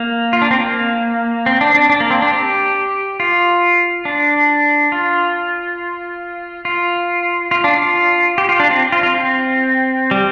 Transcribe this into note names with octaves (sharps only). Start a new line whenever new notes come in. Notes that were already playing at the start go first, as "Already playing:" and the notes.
Already playing: A#3
F4
D4
C4
A#3
C4
D4
D4
D4
A#3
C4
D4
G4
F4
D4
F4
F4
F4
D4
F4
G4
F4
D4
C4
F4
F4
C4
G3